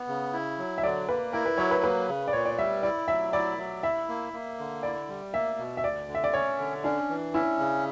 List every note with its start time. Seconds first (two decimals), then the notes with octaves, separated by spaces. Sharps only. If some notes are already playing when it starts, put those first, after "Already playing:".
Already playing: B3
0.08 C#3
0.33 E4
0.58 F#3
0.78 E5
0.83 D3 D5
1.08 A#3 B4
1.33 E4 A#4
1.46 B4
1.58 F#3 C#5
1.71 B4
1.84 A#3 B4
2.08 C#3
2.28 D5
2.33 A#2 C#5
2.45 D5
2.58 G3 E5
2.83 E4 D5
3.08 F#3 E5
3.33 E4 D5
3.59 F#3
3.83 E4 E5
4.08 A#3
4.33 A#3
4.59 D3
4.83 E4 D5
5.08 G3
5.33 A#3 E5
5.58 B2
5.77 E5
5.84 D2 D5
6.08 D3
6.15 E5
6.24 D5
6.34 C#4 C#5
6.59 D3
6.84 C#4 D4
7.09 E3
7.34 C#4 E4
7.59 C#3